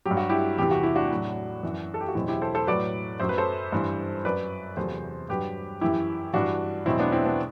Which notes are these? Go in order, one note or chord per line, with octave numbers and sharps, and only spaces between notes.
F#3 G4
G2
F#4
E4 G4
E2 C3 E3 G4
F#4
E4
D4 F#4
A2 F#3
F#2 E3
A4
G4
F#4
E2 B2 F#3 C4 E4
E4 G4
A4 C5
A4 C5
A2 F#3 B4 D5
F#2 F#3 C5
B4
A4 C5
G2 E3
F#2 F#3 B4 D5
E2 C3 F#3 A4 C5
G2 F#3 G4 B4
F#2 E3 E4 G4
G2 E3 D4 F#4
E2 B2 F#3 C4 E4
B3 D4
C4 E4
B3 D4